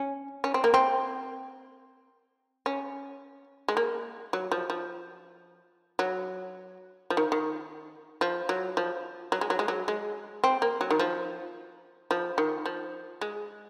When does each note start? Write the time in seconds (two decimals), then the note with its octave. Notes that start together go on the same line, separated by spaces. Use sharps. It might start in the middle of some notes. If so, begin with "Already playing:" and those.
Already playing: C#4
0.44 C#4
0.54 C4
0.64 A#3
0.74 C4
2.66 C#4
3.68 G#3
3.77 A#3
4.33 F#3
4.52 F3
4.70 F3
5.99 F#3
7.10 F3
7.17 D#3
7.32 D#3
8.21 F3
8.49 F#3
8.77 F3
9.32 F#3
9.41 G#3
9.50 F#3
9.59 G#3
9.68 F#3
9.88 G#3
10.44 C4
10.62 A#3
10.81 F#3
10.91 D#3
10.99 F3
12.11 F3
12.38 D#3
12.66 F3
13.21 G#3